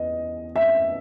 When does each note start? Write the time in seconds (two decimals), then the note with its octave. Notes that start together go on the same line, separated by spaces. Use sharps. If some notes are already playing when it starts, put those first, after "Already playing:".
Already playing: E2 D#5
0.56 E5